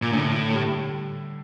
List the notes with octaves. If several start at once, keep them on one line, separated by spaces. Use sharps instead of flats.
A#2
A2 D3
G3